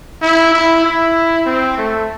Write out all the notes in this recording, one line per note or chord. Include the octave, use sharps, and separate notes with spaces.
E4
E4
E4
C4
A3